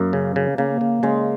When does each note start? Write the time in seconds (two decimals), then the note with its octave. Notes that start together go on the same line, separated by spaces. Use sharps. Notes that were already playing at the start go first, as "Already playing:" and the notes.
Already playing: F#2 A#3
0.13 C#3
0.36 C#3
0.58 C#3 A#3
0.81 C#3
1.03 C#3 G#3